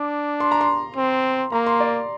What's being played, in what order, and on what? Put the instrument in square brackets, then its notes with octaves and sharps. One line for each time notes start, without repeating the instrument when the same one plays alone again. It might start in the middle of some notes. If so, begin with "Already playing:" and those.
Already playing: [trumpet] D4 [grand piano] D6
[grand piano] C6
A#5
C6
[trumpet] C4
[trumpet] A#3 [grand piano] A#5
[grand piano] C6
D5